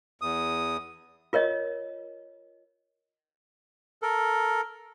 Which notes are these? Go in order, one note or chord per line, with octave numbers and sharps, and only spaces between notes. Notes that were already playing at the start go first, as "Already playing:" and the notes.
E2 D#6
F4 A#4 C#5 D#5
A4 A#4